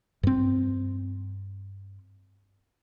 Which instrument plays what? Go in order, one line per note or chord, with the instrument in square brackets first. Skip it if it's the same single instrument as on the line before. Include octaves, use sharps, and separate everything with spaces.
[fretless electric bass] G2 C4